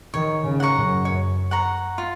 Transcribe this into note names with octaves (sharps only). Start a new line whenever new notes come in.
D#3 C#5
C#3
F#5 A#5 C#6
F#2
C#5
F#5 A#5 C#6
F4